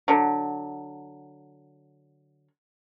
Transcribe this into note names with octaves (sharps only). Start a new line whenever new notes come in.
D3 F#3